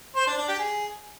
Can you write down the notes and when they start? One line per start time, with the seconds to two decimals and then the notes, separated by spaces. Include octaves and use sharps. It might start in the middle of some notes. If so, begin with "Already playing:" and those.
0.16 C5
0.27 D4
0.38 D4
0.48 G4
0.59 G#4